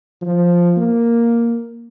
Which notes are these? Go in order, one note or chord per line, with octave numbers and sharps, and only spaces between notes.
F3
A#3